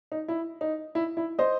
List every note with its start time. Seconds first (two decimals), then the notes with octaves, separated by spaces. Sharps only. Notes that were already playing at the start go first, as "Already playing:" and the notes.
0.12 D#4
0.28 E4
0.61 D#4
0.95 E4
1.17 E4
1.39 C5 D#5